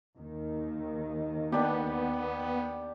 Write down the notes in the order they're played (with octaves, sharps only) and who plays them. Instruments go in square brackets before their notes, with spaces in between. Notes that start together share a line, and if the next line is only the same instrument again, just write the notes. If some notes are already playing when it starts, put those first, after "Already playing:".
[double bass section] D#2 D#3
[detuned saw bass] B3 [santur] D4 G4